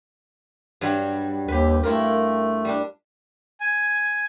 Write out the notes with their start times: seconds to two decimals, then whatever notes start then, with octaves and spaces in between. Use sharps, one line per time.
0.81 G2 F#3 G3
1.48 D#2 G4 B4
1.83 A3 E4 F4 A#4
2.65 G3 D4
3.60 G#5